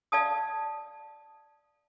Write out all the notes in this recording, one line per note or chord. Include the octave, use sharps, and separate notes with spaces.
D5 F5 A5 D#6